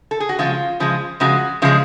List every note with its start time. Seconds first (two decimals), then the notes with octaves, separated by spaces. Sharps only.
0.11 A4
0.20 G#4
0.29 F#4
0.39 C#3 F3 G#3 F4
0.80 C#3 F3 G#3
1.20 C#3 F3 G#3 F#4
1.62 C#3 F3 G#3